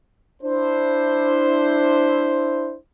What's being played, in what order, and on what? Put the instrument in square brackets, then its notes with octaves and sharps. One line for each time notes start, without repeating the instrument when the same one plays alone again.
[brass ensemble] D4 E4 C5